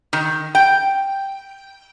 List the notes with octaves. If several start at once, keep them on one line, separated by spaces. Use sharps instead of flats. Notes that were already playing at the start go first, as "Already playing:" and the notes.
D#3
G5